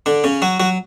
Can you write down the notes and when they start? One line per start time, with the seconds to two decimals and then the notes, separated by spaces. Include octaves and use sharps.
0.06 D3 D4
0.24 C#3 C#4
0.42 F#3 F#4
0.60 F#3 F#4